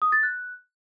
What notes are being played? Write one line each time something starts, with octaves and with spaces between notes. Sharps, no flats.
D#6
A6
F#6